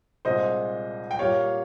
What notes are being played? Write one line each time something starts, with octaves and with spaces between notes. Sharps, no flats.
C2 A#2 G#3 C5 D#5
G5
A#2 G3 A#3 C#5 F5